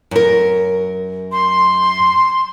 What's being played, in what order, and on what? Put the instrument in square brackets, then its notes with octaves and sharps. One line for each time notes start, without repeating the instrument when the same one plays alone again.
[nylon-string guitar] F#2 A#4
[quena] C6